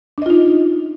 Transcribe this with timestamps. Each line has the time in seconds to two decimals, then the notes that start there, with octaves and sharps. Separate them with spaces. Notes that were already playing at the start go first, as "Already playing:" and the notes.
0.18 D4
0.22 D#5
0.26 F4
0.30 D#4